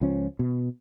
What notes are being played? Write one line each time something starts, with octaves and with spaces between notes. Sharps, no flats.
C#2 F3 C#4
B2